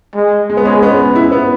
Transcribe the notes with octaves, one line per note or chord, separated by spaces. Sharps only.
G#3
G#3
B3
G#3 C#4
B3
E4
B3